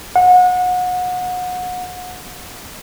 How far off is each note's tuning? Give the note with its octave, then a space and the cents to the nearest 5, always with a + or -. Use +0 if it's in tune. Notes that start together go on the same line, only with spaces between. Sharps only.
F#5 -30